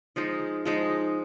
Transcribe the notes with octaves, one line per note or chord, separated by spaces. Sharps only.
F3 G#3 D#4
F3 G#3 D#4